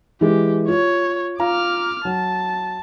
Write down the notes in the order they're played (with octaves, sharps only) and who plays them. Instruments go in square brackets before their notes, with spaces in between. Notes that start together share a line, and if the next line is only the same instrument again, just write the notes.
[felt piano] E3 G#3 [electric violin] G4
[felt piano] F4 [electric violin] C#5
[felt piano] F4 F5 A#5 [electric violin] D6 F6
[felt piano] F#3 [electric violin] A5